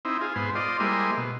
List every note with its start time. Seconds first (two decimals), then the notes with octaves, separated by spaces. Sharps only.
0.05 C4 D#4 E4
0.21 F4 G#4
0.36 G#2 B3 C5
0.55 F4 C5 D5 D#5
0.80 G3 G#3 A#3 E4 C5 D#5
1.17 B2